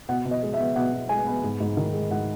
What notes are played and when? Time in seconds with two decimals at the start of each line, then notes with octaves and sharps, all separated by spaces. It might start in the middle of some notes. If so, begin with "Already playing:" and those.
0.09 B2 F#5
0.25 B2
0.31 D#5
0.43 G#3
0.54 E5
0.59 B3
0.76 B2 F#5
0.93 B2
1.09 G#3 G#5
1.26 B3
1.44 G#2
1.60 G#2
1.77 D#3
1.93 G#3
2.11 G#2 F#5